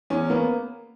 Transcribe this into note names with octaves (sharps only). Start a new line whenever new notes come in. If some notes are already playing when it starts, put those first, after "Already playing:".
E2 C#4
A#3 B3